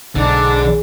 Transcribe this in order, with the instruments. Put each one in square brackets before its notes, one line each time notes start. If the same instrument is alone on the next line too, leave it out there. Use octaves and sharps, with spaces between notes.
[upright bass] B1 [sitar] G#2 [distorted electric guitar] D3 [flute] D4